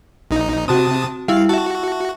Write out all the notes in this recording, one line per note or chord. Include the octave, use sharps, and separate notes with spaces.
A#1 D#4
C3 C4 F#4 A5 D#6
G3 E4 F5
F#4 E5 A5